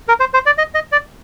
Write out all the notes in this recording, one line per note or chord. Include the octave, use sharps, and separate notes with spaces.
A#4
C5
C5
D5
D#5
D#5
D5